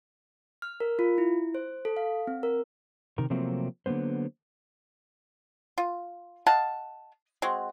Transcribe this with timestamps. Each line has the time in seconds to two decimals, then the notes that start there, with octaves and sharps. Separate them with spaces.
0.62 F6
0.80 A#4
0.99 F4
1.18 E4
1.55 C5
1.85 A4
1.97 F5
2.27 C4
2.43 A#4
3.18 C3 D#3 A#4
3.30 C3 F3 F#3 A3 A#3 C4
3.86 D3 F#3 A#3 B3 C5
5.78 F4
6.46 D#5 F5 F#5 A5
7.42 G#3 C4 F#4